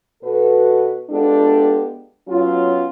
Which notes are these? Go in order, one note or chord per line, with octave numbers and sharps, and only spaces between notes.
B2 F#4 A4 B4
G#3 B3 D4 F4 G4 A4
F#3 B3 C#4 F4